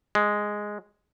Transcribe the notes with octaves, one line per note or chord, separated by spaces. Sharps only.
G#3